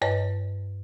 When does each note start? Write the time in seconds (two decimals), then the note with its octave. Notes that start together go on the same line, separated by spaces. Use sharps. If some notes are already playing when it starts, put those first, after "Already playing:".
0.02 G2 B4 C#5 D#5 A5